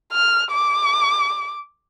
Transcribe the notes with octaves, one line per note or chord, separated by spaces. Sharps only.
F6
D6